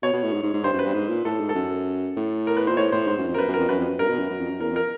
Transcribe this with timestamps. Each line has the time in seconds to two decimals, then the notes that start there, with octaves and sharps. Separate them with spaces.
0.03 B2 C#5
0.13 B2
0.24 A2
0.33 G#2
0.44 G#2
0.54 G#2
0.64 G2 C5
0.74 F#2
0.79 B4
0.85 G2
0.94 G#2
1.09 A#2
1.25 A2 A4
1.41 G#2
1.49 A4
1.55 F#2
2.17 A2
2.47 A#4
2.57 B4
2.67 A#2 C5
2.77 A2 C#5
2.92 A2 C5
3.07 G#2 C5
3.18 F#2
3.28 F2
3.34 A#4
3.38 F#2 B4
3.49 F#2
3.54 A#4
3.59 F2
3.69 F#2 B4
3.79 F2
3.89 F#2
3.99 G2 A#4
4.09 B2
4.19 F#2
4.30 F#2
4.40 F2
4.51 F#2
4.60 E2 A#4
4.71 F2
4.76 A#4